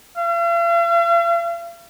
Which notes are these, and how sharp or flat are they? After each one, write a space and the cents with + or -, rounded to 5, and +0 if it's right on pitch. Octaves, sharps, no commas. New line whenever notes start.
F5 -45